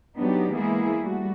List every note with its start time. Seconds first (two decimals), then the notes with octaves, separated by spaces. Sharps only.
0.18 F#3 B3 D4 D#4 G4
0.54 E3 G#3 A#3 B3 E4 G#4
1.00 G3 A3 F#4